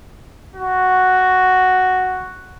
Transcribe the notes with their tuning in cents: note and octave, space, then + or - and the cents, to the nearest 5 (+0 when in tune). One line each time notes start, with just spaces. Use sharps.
F#4 +0